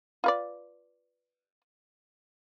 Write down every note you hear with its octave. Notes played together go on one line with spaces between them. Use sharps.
F4 B4 D5